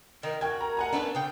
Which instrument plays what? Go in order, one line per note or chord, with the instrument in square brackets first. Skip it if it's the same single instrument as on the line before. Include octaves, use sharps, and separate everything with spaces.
[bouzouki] D#3 [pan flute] A#4
[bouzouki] F#4 [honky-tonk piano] G5 G#6
[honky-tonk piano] A#5
F#5 G#5 A#5
[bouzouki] A3 B3 B4 [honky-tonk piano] D4
[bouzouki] C#3 G5